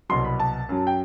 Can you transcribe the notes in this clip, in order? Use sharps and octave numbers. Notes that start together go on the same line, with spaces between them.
C2 B2 F#3 C6
B5
A5
F#2 F#3
G5